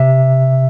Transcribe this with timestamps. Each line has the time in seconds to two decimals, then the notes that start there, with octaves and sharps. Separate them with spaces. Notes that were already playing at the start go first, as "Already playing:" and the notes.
Already playing: C3 E5